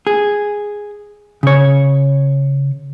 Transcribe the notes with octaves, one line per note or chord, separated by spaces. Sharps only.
G#4
C#3 C#5